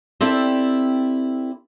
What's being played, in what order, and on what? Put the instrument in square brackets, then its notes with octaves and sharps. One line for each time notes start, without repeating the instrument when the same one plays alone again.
[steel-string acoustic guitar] C4 E4 G4 A4 D5